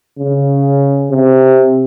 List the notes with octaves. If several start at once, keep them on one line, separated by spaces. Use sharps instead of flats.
C#3
C3